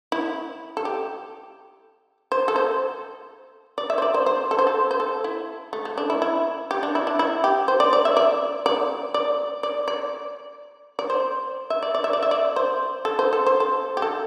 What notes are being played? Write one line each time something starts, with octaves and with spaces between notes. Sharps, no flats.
E4
A4
G4
C5
A4
C5
D5
E5
C5
D5
C5
C5
A4
C5
A4
C5
A4
E4
A3
A3
D4
E4
E4
G4
D4
E4
D4
E4
G4
C5
D5
D5
E5
D5
D5
D5
D5
D5
D5
C5
E5
D5
D5
E5
D5
E5
D5
C5
A4
C5
A4
C5
A4
G4
A4